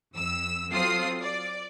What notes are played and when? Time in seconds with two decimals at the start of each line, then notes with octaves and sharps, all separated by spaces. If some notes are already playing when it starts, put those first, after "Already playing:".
0.16 F2 E6
0.72 F#3 C4 F4 A4 D#6 C7
1.22 D5